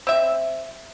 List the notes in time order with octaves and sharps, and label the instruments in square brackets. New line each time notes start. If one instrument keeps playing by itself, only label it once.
[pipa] C4 E5